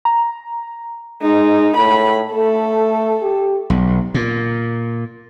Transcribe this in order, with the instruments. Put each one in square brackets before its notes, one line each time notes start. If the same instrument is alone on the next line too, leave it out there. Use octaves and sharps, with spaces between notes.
[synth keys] A#5
[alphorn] G#3 [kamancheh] D#4
[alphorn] A2 [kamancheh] B5
[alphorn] A3 [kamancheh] A4
[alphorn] G4
[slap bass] B1
A#2